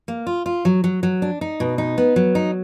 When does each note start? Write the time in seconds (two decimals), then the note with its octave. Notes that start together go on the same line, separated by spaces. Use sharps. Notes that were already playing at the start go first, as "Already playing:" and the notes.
0.08 A#3
0.27 F4
0.46 F4
0.65 F#3
0.84 F#3
1.03 F#3
1.22 D4
1.41 D#4
1.60 B2
1.78 D#4
1.98 B3
2.16 F#3
2.35 D#4